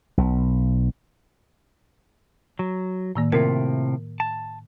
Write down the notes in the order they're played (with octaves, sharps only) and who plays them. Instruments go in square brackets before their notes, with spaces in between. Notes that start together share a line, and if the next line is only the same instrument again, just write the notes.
[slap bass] B1
[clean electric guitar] F#3
[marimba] A2 D#3 A#3
[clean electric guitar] A2 C3 F4 [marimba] A#4
[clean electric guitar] A5